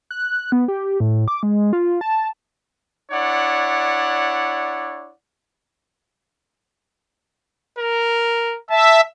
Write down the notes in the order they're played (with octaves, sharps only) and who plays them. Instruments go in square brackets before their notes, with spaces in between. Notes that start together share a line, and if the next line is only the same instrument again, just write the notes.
[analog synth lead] F#6
B3
G4
A2
D6
G#3
F4
A5
[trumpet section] D4 E4 C#5 D5 F#5
[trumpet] A#4
[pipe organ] E5 [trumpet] A5